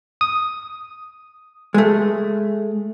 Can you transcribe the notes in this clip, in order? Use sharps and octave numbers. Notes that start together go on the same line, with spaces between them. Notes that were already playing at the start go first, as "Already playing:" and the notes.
D#6
G#3 A3